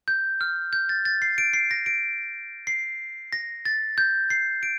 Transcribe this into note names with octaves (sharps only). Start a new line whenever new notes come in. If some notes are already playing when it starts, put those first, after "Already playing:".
G6
F6
G6
A6
A6
C7
D7
C7
A#6
D7
C7
A#6
A6
G6
C7
D7